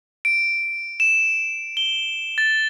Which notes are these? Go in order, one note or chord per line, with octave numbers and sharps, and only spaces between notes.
D7
E7
G7
A6